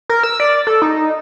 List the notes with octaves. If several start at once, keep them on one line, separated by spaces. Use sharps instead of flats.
A#4
E6
D5
A4
D#4